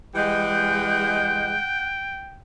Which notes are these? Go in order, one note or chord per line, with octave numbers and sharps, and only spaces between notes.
E3 G3 G#3 F#5 G5 F#6 G6